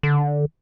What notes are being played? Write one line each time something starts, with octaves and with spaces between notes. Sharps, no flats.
D3